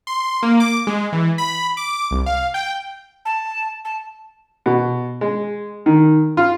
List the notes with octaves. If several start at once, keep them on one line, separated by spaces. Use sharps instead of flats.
C6
A#3
D6
G#3
E3
B5
D6
C2
F5
G5
A5
A5
B2
G#3
D#3
F4